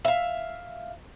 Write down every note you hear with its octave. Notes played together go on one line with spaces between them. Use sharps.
E5 F5